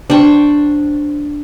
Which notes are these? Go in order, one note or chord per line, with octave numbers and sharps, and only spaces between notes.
D4 C5 G5 C#6